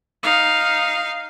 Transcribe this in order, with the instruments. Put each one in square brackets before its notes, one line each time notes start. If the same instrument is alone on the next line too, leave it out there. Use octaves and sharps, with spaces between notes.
[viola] D#4 F5